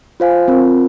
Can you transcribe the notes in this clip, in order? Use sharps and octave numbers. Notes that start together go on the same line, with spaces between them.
F4 C5 F5 G#5
C4 F4 A#4